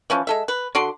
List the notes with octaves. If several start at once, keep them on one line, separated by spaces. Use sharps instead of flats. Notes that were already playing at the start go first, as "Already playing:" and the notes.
E3 F3 C#4
G#3 A4 E5
B4
D3 F#4 D5 C6